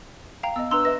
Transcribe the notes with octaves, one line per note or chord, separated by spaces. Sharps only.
F5 G5 A#5
B3 D#5 E6
D4 B4 A#5 C6 E6
B4 D#5 E5 A#6